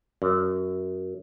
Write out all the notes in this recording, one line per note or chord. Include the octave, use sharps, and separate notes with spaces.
F#2